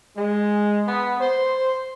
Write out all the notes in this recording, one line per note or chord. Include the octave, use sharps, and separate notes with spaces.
G#3
B3
C5